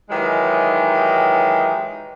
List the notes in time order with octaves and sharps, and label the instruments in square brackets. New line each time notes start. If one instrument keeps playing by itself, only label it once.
[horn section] D#3 E3 F#3 G#3 D#4 G4